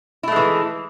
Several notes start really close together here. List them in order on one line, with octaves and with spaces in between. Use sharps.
E4 A3 G#3 E3